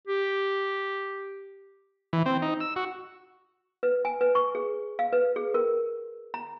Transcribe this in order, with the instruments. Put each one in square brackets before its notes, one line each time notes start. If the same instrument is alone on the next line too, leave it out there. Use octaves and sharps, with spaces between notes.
[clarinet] G4
[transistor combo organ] E3
C4
D#4
E6
F#4
[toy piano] B4
G#5
B4
C#6
G#4
F5
B4
G#4
A#4
A#5